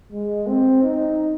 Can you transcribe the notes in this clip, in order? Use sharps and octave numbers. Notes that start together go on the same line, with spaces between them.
G#3
C4
D#4